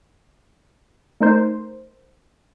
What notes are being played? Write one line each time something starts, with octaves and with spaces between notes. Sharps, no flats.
A3 D#4 A#4 C5